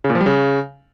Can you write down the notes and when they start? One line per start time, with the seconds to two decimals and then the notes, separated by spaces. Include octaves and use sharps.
0.04 C#3
0.10 A#2
0.15 F3
0.21 G3
0.26 C#3